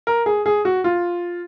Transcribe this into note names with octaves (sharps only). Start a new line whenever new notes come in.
A#4
G#4
G#4
F#4
F4